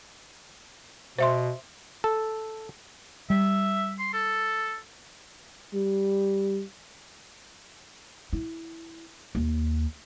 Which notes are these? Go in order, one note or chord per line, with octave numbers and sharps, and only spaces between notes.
B2 C5 E5 C6
A4
G3 E5
C6
A4
G3
E4
D#2